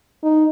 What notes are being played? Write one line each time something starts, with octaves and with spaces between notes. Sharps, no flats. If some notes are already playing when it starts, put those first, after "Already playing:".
D#4